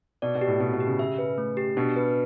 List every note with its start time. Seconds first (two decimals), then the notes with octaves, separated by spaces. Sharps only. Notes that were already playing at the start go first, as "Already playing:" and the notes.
0.22 B2 D5
0.35 B2
0.41 G4
0.47 A2
0.60 B2 G4
0.73 B2
0.80 G4
0.87 C#3
0.99 E5
1.18 B4
1.38 A3
1.57 G4
1.77 B2 D4
1.96 B4